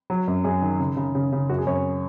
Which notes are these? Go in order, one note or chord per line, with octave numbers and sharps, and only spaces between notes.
F#3
F#2
F#2 G#4
D#3
C#3
C#3
C#3
C#3
F#2 F#4
G#4
F#2 C#5